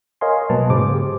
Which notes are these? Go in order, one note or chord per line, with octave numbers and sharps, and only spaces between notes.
A#4 C#5 D#5 F5 G#5 C6
B2 F#3 A#3 B4 A5
G#2 C#3 G#4 C5 D6
G4